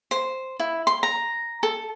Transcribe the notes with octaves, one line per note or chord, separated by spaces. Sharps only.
C5
E4
C6
A#5
A4